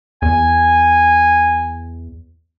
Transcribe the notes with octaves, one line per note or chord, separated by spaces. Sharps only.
E2 G#5